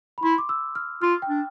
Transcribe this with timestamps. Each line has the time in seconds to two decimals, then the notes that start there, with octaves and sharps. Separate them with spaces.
0.18 B5
0.23 E4 C6
0.38 D6
0.49 E6
0.75 F6
1.02 F4 F6
1.22 G5
1.29 D4